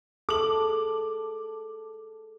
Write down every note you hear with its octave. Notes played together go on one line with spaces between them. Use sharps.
G#4 A4 D6 F#7